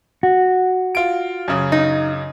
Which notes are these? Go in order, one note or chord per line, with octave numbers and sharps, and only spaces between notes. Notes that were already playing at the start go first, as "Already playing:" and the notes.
F#4
F4 D7
F#2 C#3
D#4